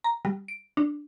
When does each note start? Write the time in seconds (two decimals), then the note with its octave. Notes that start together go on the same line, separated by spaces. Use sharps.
0.04 A#5
0.25 G3
0.48 D7
0.77 D4